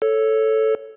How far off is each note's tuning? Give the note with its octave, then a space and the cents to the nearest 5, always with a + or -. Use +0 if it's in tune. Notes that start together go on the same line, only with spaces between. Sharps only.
A4 +0 C#5 +0